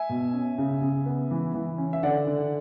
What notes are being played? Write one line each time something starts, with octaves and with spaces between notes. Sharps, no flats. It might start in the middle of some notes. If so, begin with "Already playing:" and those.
Already playing: E5 G#5
B2
C#4
C#3
C#3
B3
E3
E3
C#4
E5
D3 D5 F#5
D3